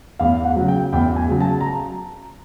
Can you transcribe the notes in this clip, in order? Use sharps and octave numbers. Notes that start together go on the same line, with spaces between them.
E2 F5
F#5
C#3 F#3
G5
E2 G5
G#5
C#3 F#3
A5
A#5